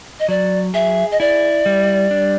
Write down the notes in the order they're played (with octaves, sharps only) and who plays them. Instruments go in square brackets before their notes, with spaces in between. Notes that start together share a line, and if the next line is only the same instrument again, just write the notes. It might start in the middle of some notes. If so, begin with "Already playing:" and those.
[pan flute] D#5
[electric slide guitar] F#3 [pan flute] D5
[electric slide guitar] G#4 [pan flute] E5
[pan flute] D#5
[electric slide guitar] E4 [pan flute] D5
[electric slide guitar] G3
D4